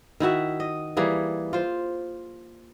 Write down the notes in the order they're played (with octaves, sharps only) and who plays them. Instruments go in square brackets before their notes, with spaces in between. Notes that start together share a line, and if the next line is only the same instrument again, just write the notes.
[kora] D#3 E4 F#4 E5
D#5
E3 G3 A#3 G#4
F4 C5